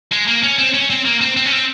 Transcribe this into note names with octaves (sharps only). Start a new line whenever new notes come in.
G#3
A#3
C#4
C4
C#4
C4
A#3
C4
C4
C#4
C4